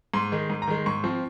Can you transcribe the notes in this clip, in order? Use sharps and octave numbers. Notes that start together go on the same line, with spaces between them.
G#2 C6
D#3 G#3
G#2
A#5
D#3 G#3
G#2 C#6
F3 C4